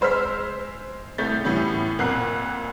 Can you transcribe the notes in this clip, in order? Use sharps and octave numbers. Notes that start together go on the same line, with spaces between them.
G#3 C5 E6 F6 B6
C2 A3 G6 A6 B6
A2 E3 G3 B3 C#4
F2 A#2 F#5 A#5 F#6 C7